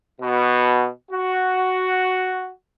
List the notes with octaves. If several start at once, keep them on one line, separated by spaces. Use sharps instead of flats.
B2
F#4